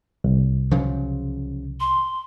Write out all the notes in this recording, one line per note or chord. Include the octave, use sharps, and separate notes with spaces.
C2
C#3 F3 F#3
C6